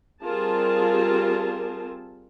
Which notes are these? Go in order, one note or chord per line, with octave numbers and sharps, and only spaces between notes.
G3 C4 F4 G#4 A#4 A5